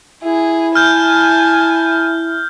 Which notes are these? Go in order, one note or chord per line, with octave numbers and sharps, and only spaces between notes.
E4 G#4
G#5 A5 F6 G6